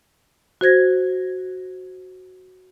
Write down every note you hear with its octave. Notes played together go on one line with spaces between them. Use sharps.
F#4 C5 G#6 A#6